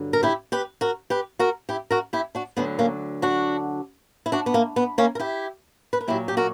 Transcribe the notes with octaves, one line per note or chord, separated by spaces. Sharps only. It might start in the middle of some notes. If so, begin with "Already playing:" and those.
Already playing: G2 D3 F#3
A#4
E4 G4
G4 B4
F#4 A#4
G4 B4
F#4 A#4
E4 G4
F#4 A#4
E4 G4
D4 F#4
D2 D3 F#3 B3
A#3 C#4
D4 F#4
E4
D4 F#4
B3
A#3
B3
A#3 C#4
A#4
E4 G4
B4
A#4
A#2 F#3 E4 G4
G4
F#4 A#4